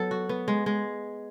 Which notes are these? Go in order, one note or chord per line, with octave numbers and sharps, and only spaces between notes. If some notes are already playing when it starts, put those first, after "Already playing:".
Already playing: F#3 B3 A4
F#4
B3
G#3
G#3